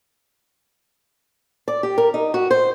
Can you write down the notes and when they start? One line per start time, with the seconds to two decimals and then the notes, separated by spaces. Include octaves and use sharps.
1.68 D5
1.83 G4
1.98 A#4
2.14 D#4
2.34 F#4
2.51 C5